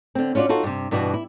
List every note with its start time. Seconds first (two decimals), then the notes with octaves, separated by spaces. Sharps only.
0.15 D3 C4
0.35 C#4 D4 F4 F#4 D5
0.49 D#4 F4 F#4 A4
0.63 G2 C3
0.91 G2 B2 E3 D4 F#4
1.14 E4